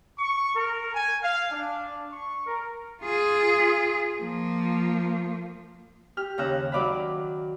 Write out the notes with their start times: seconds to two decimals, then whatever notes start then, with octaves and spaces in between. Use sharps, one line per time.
0.19 C#6
0.56 A#4
0.95 G#5
1.23 F5
1.52 D4
2.12 C#6
2.46 A#4
3.02 F4 G#4
4.20 F3 A#3
6.17 G4 F6
6.38 D#2 C#3 F5 A#5 E6 F#6
6.72 D#3 F#3 D5 F5 B5